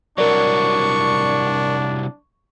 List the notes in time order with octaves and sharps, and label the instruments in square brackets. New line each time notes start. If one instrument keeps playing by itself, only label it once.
[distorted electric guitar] C2 F#3 [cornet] D4 [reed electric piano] A#4 D5 [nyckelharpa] C#6